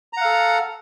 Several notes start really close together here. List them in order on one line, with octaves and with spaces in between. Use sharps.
A#5 F#5 F5 A4